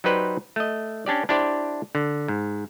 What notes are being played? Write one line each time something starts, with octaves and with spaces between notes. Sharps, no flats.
F#3 D#4 G4 B4 C5 D5
A3 D#5
C#4 D4 G4 D5
D4 E4 G4 C5 D5
D3
G#2